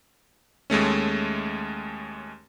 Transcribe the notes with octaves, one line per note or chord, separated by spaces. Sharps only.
D#2 G#3 A3 C#4